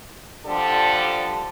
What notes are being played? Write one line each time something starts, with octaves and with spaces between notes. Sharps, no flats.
D3 F3 G3 D4 A4